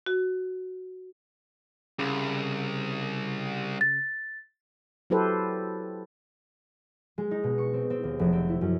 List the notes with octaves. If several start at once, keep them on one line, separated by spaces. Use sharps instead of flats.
F#4
C2 C#3
A6
F#3 E4 G4 A4 B4 C5
G#3
D#4
B2
C#6
C4
C4
D#2
F1
C4
E4
F#2